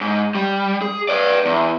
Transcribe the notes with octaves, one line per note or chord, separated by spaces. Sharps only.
G#2
G3
G#4
B4 D5
E2